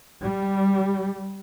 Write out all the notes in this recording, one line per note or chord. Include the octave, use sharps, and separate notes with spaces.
G3